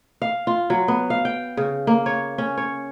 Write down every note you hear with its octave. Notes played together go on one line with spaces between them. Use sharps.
F5
F4
F#3
B3
F5
G5
C#3
A#3
C#5
C#4
C#5